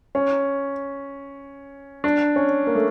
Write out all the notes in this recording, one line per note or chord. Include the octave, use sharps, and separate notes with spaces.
C#4
D4
C#4
A#3
A3